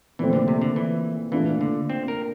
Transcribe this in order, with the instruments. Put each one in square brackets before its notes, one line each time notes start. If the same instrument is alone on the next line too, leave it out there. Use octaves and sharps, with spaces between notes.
[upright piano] A#2 F3 A3 C4 [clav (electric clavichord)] E3
[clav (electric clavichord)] D3
C3
D3
E3
[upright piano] A#2 A3 D4 F4 [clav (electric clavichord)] E3
[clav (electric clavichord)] D3
C4
A#4